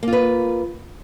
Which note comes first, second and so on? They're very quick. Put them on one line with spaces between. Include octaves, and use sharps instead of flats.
A#3 F4 B4